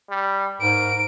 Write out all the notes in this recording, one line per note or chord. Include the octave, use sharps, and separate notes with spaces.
G3
G#2 A#4 D7